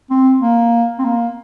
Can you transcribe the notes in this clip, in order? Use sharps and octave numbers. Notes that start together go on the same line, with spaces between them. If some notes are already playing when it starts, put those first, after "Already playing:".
C4
A#3
C4
A#3